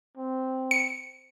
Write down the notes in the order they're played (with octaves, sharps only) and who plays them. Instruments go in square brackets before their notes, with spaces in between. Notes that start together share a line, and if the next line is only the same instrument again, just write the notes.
[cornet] C4
[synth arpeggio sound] C#7